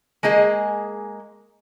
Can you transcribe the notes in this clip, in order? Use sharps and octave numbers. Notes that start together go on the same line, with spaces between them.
G#3 A#3 G#4 D#5